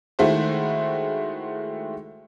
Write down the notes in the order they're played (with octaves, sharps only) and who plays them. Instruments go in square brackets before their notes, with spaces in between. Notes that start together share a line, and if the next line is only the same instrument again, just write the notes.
[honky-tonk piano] D#3 G#3 A3 E4 F#4 C5